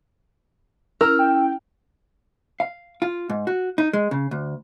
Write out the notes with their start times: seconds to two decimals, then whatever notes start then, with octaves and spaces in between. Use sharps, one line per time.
1.01 C#4 E4 A#4 E6 F6
1.19 G5
2.60 F5
3.02 F4
3.30 G#2
3.47 F#4
3.78 D#4
3.93 G#3
4.11 C#3
4.31 D2